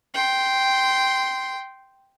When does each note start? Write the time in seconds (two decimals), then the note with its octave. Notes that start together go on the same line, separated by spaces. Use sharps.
0.14 G5 C6